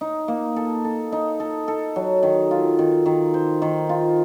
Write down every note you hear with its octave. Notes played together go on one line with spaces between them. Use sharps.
D#4
A#3
A4
A4
D#4
A4
A4
F#3
D#3
F4
D#3
D#3
C5
D#3
F4